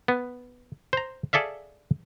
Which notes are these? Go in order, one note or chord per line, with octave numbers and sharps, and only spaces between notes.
B3
C5 A#5
G#4 A4 D5 E5 F5